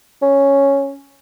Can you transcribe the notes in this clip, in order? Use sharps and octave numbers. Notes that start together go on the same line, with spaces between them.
C#4